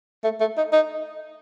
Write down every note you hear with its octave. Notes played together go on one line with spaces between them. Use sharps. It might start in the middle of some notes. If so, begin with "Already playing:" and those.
A3
A3
D#4
D#4